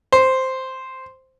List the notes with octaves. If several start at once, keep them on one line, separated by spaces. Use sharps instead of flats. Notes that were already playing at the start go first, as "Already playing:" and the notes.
C5